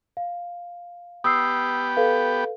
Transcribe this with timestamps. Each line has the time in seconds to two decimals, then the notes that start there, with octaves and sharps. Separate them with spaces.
0.17 F5
1.24 B3 G4 D#6 E6 C7
1.97 A4 B4 F5